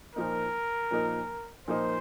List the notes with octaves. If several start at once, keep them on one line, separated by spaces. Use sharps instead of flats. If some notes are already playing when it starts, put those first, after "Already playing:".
A#2 F3 A#3 D#4 A#4
A#2 F3 A#3 D#4
A#2 F3 A#3 D#4 C5